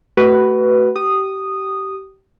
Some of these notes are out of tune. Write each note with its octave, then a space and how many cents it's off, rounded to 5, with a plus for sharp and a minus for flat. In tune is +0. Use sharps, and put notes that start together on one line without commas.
A3 +0 F#4 +25 B4 +0
G4 -25 D#6 -10